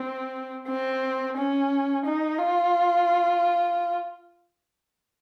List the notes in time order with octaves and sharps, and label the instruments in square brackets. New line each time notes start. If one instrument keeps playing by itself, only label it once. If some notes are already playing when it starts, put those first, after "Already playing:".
Already playing: [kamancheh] C4
C4
C#4
D#4
F4